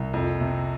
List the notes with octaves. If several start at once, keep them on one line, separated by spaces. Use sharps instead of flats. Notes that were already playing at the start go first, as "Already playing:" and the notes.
Already playing: C2
F2
C3